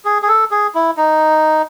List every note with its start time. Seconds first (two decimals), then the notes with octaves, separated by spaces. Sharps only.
0.05 G#4
0.22 G#4
0.28 A4
0.51 G#4
0.75 E4
0.97 D#4